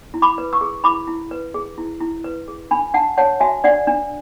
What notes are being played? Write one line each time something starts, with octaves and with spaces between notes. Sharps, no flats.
E4
B5 D6
B4
C#6 E6
G#4
E4 B5 D6
E4
B4
G#4
E4
E4
B4
G#4
D4 G#5 B5
D4 F#5 A5
C#5 F#5 A5
F#4 E5 G#5
D4 D5 F#5
D4